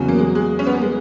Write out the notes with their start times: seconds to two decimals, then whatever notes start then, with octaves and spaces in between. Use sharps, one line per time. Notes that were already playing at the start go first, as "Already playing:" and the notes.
Already playing: E2 C#3 F#3 C#4
0.08 A#3
0.18 G#3
0.35 G#3
0.59 C#4
0.67 B3
0.74 A#3
0.81 G#3